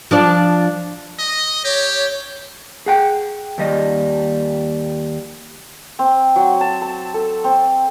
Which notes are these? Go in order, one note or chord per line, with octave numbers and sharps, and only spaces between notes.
F3 D4 D5
D#5
G4 C#5
G#4 F#5 G5
D#2 G3 D#5
C4
F#3
A5
A5
A4
C4